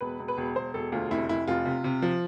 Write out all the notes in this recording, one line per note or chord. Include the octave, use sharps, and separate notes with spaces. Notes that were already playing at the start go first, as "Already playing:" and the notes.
E1 B4
E1
B4
E1
E1 C5
E1 A4
D2 F4
F1 E4
F1 E4
F1 F4
C3
C3
F3